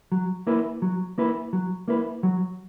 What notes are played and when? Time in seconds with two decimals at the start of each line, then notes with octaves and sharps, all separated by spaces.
0.12 F#3
0.47 A#3 E4 B4
0.82 F#3
1.18 A#3 E4 B4
1.53 F#3
1.88 A#3 E4 B4
2.23 F#3